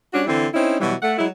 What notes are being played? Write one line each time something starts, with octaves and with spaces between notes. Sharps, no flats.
G3 C#4 D4 F#4
D3 E3 C4 E4
C4 C#4 D#4 E4
B2 E3 F#3 G3
A3 F#5
F#3 G#3 E4